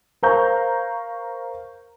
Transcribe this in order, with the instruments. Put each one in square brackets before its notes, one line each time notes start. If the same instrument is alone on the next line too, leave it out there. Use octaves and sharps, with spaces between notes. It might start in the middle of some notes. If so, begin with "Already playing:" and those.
[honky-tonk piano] A#4 C5 F5 A#5 C#6 G6